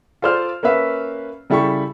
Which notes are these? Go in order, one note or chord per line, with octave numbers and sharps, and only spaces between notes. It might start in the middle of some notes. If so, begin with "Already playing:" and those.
F4 A4 C5 D5 F6
A#3 C#4 B4 E5 F5
C#3 G3 E4 A4 G5 C#6